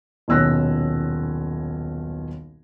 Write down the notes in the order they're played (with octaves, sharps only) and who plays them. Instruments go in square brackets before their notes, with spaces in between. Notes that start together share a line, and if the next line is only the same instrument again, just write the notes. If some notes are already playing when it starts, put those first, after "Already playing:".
[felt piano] D#1 B1 C#4 E6 F#6 A#6